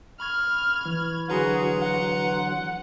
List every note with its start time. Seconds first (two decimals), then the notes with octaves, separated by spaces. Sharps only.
0.20 B5 C#6 F6 G#6
0.86 E3
1.30 D3 F#3 F#4 G#4 B4 A#5 C6
1.81 F#5